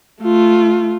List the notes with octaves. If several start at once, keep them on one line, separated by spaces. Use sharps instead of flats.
A3 F4